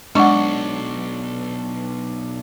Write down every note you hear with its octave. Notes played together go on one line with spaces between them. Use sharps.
B1 G#3 D4 F#5 C#6